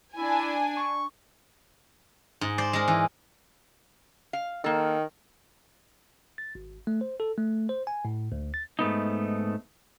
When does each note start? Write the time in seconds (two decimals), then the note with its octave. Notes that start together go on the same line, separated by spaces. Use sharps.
0.16 D4 E4 G#5
0.77 C#6
2.41 G#2
2.58 C5 D5
2.73 G#3 A#4
2.88 E3
4.33 F5
4.64 D#3 A#3 A4
6.38 A6
6.55 G#1
6.87 A3
7.01 C5
7.20 A4
7.38 A3
7.69 C5
7.87 G#5
8.05 A2
8.32 D2
8.54 A6
8.79 G#2 A3 B3 D#4